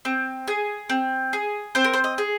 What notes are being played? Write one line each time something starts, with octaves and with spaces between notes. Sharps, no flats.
C4
G#4
C4
G#4
C4 C5
A#4
C5
D#5
G#4